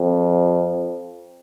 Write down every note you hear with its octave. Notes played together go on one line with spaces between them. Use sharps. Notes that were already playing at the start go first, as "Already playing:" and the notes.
Already playing: F2